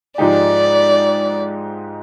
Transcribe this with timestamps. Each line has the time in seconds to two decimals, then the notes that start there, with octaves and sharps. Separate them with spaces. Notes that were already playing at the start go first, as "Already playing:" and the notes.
0.18 G#2 F3 G#3 D#4 G4 D5